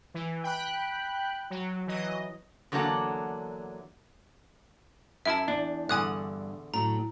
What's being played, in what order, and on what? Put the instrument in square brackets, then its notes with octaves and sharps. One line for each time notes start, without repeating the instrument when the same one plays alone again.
[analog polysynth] E3
G5 B5 F#6
F#3
E3 F#3 D#5
[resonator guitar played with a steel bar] E2 D3 F#3 A#3 A4 F#5
[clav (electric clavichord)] F#2 E4 [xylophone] E5 A5
[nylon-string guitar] E2 [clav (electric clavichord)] D4
[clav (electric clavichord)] E2 D3 [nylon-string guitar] G2 F#5 [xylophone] G#5 D#6 F#6
[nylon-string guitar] A2 F#3 [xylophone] A#5